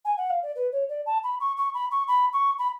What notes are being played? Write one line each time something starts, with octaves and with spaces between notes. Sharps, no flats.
G#5
F#5
F5
D5
B4
C#5
D5
A5
B5
C#6
C#6
B5
C#6
B5
C#6
B5